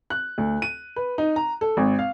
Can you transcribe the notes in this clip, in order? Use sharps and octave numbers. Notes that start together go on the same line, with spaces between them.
F#6
D2
D#7
B4
D#4
A#5
A4
G#1
F5